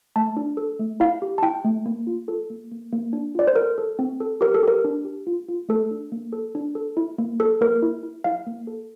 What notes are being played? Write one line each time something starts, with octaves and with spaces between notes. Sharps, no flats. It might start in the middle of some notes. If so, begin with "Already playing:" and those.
A3 A5
D4
A4
A3
E4 F5
G4
A5
E4 G5
A3
A#3
F4
F4 A4
A#3
A#3
A#3
D4
F4 D5
C5
A4 A#4
A4
C4
A4
G4 A#4
A4
G4 A#4
D4
G4
F4
F4
A3 A4
D4
A#3
A4
D4
A4
E4
A#3
A4
A#3 A#4
E4
E4
E4 F5
A#3
A4